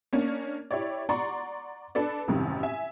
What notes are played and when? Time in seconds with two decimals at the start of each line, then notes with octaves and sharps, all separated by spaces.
0.13 A#3 C#4 D4 C#5
0.71 E4 G4 C#5 D5
1.09 D5 F#5 A#5 C6 C#6
1.95 D4 A4 B4 D5
2.28 A1 F#2 C3 D#3 G3
2.63 E5 G#5